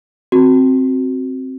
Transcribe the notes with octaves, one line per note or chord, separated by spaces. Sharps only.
C4 F#4